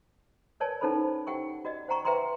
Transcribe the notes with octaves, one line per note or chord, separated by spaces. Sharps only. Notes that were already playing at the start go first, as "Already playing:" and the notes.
A#4 B4 C#5 D5 G#5 A5
C#4 D#4 E4 A4 C5 B5
G4 F#5 G5 C#6
F#4 D5 D#5
C5 F#5 G5 A#5 C#6
B4 E5 G5 A#5 C6 D6